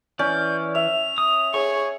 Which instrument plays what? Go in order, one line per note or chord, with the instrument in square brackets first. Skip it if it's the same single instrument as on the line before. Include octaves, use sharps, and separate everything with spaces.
[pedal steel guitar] E3 D5 [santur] C#4 [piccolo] G6
[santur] E5 [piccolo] F7
[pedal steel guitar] D#6
[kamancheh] G#4 C#5 [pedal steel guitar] C#6